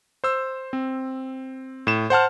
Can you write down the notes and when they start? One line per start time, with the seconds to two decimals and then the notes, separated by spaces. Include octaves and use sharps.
0.24 C5 E6
0.73 C4
1.87 A2 E7
2.10 C5 F#5 A5 F6